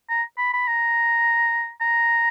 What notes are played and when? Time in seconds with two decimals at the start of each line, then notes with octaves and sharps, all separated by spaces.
0.10 A#5
0.38 B5
0.53 B5
0.67 A#5
1.81 A#5